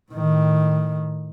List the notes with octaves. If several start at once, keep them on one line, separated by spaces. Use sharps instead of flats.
A2 D#3